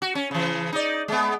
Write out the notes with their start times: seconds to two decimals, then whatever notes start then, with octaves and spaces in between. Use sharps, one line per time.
0.02 F#4
0.15 C#4
0.31 C#3 E3
0.73 D#4 D5
1.08 G#3 B3